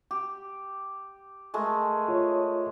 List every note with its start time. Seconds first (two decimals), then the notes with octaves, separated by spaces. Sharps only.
0.11 G4
1.54 G#3 A3 A#4
2.08 F4 C#5